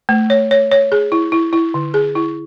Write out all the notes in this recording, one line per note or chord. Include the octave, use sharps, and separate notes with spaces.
A3
C#5
C#5
C#5
G#4
E4
E4
E4
D3
G#4
E4